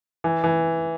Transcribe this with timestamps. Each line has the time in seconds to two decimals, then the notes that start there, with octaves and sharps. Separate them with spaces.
0.24 E3
0.44 E3